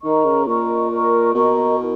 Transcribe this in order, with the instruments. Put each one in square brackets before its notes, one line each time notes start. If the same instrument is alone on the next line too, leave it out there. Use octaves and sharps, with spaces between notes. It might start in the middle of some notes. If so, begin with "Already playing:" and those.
[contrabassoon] D#3 [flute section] A#4 D#5 A#5 C#6
[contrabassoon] C#3
[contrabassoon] A#2 [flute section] A#4 D#5 A#5 C#6
[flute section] A#4 D#5 A#5 C#6
[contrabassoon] B2 [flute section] A#4 D#5 A#5 C#6
[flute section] E4 A#4